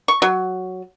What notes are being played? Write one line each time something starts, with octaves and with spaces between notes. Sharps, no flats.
C#6
F#3